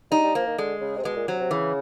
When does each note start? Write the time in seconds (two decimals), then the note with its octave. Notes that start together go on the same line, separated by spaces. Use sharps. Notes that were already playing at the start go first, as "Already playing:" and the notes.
0.11 G3 D#4
0.23 G3
0.35 F3 A#3
0.47 D#3
0.58 D3 G#3
0.81 C#3
0.97 C3
1.04 B2 G#3
1.16 A#2
1.28 C3 F#3
1.40 C3
1.51 C#3 E3